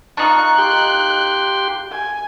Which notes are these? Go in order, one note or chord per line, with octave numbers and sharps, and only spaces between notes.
D4 D#4 F4 C#6 F#6
G4 G5 C6
G#5